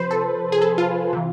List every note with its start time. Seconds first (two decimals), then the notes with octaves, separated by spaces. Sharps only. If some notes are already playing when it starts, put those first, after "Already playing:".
Already playing: C3 F3 B4 C5
0.11 A4
0.52 G#4
0.62 A4
0.78 F4
1.13 C3 E3